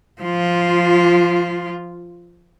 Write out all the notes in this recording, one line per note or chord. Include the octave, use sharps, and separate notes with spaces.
F3 F4